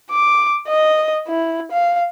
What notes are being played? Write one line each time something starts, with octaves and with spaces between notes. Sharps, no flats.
D6
D#5
E4
F5